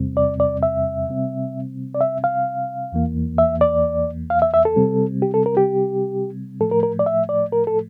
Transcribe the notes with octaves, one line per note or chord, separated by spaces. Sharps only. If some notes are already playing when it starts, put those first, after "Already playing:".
Already playing: E2 C3 G3 C4
D5
D5
E5
C3 G3 C4
D5
E5
F5
E2 E3 A#3
E5
D5
F5
E5
E5
A4
C3 G3 C4
G4
A4
A#4
G4
A2 F3 A3 A4
A#4
A#4
D5
E5
D5
A#4
A4